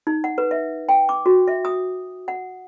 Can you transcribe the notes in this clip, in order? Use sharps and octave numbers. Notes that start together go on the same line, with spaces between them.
D#4
F#5
B4
E5
G5
D6
F#4
E5
D#6
F#5